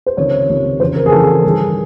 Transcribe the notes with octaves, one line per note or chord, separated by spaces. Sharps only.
C5
C#2 C3 D#3 C#5
C#2 C3 D#3
F2 C#3 E3 C5
A#4
G#4
F2 C#3 E3 A4
G2 D#3 G#4